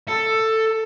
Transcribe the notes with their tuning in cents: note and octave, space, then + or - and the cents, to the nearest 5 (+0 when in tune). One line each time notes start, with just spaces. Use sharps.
A4 +10